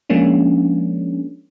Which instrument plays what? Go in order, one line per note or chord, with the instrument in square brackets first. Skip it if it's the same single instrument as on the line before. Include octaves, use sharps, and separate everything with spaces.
[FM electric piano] F3 G#3 A#3 C#4 D4